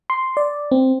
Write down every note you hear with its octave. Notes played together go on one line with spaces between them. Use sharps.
C6
D5
C4